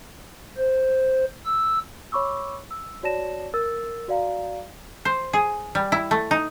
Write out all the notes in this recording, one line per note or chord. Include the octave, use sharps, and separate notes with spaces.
C5
E6
C#5 B5 C#6 D6 E6
E6
F#4 C#5 D5 A5 A#6 E7
A#4 E6 A6
F#4 D5 F5 A#5
C5
G#4
G3
E4
A3
D#4